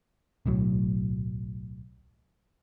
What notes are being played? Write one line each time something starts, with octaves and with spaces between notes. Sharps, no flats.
D1 B1 A2 F#3